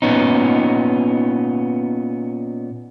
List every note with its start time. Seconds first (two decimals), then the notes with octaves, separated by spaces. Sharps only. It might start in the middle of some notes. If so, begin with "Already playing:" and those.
0.02 A#2 B3 C#4 D#4